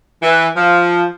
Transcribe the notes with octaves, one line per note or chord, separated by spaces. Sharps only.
E3
F3